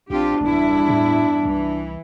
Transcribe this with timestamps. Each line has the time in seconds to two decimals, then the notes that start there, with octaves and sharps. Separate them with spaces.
0.10 A#1 C4 D4 F4 G4
0.41 F#1 E2 G2 E4
0.88 A2
1.45 C2 E3